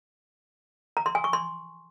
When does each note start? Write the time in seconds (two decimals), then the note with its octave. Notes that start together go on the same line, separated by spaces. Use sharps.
0.97 A#5
1.06 C6
1.15 G#5
1.24 C#6
1.33 C6